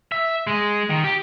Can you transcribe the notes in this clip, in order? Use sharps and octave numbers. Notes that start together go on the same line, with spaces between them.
E5
G#3
D#3
G4